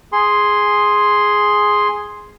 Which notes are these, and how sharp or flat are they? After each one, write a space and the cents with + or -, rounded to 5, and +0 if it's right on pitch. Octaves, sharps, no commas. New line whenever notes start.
G#4 +0 C6 +0